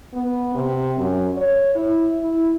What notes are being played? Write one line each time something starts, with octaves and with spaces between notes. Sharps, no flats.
B3
C3
F#2
C#5
E4
E4